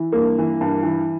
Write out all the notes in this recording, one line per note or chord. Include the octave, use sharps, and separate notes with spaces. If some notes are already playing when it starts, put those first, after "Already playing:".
Already playing: E3
G2 A#3
E3
G2
E3